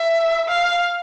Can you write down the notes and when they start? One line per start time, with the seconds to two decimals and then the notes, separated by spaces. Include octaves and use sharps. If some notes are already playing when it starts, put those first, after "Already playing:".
Already playing: E5
0.48 F5